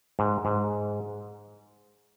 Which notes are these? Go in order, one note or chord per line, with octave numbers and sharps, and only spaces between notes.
G#2
G#2